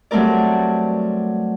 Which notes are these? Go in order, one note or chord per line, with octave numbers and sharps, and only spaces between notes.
F#3 G3 A3 C4 A#4 D5